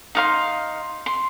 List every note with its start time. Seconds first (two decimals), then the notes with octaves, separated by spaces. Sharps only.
0.15 D#4 F5 C6
1.06 C6